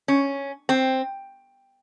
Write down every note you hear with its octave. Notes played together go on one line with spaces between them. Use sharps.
C#4
C4